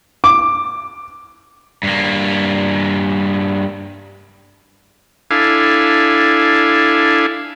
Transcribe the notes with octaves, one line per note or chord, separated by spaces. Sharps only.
D6
G2 A#3
D4 E4 A4 F5 G#5